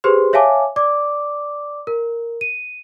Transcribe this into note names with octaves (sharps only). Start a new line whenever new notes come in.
G4 G#4 B4 C5 C6
C#5 E5 F5 G#5 A5 D6
D5 D6
A#4
D#7